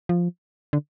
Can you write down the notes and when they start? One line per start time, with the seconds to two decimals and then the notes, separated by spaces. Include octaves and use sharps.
0.09 F3
0.73 D3